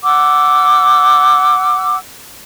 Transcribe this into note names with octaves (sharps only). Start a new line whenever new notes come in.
F#5 D6 E6